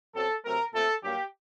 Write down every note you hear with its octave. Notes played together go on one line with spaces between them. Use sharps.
F#2 F#3 C4 A4
C3 F#3 A3 C4 A#4
A#2 A3 C4 A4
G2 F#3 A#3 G4